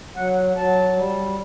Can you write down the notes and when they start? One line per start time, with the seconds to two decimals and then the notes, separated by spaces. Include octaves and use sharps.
0.16 F#3 F#5
0.56 F#3 A5
0.97 G3